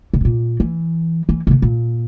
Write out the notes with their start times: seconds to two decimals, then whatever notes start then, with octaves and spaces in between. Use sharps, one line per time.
0.14 C3
0.21 A2
0.25 A#2
0.60 E3
1.29 E3
1.47 C3
1.51 D3
1.62 A#2